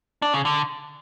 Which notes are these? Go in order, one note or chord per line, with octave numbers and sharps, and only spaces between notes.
D4
C#3
D3